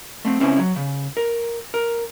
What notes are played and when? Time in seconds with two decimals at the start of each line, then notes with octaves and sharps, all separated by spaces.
0.25 A3 C4
0.40 C#2 C4 C#4 E4 B4
0.59 F#3
0.76 C#3
1.17 A#4
1.74 A#4